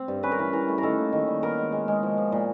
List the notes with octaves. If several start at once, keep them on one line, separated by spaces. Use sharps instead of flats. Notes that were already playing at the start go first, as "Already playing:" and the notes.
Already playing: C4
G2
C#4 B4
A#4
E3 B4
E3 A#4
A3
A#4
D#3 A4
A#3
D#3
G3
B3 A#4
G#3
G#3
G#3
F3
F3
A#2